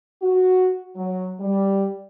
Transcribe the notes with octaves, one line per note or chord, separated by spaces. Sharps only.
F#4
F#3
G3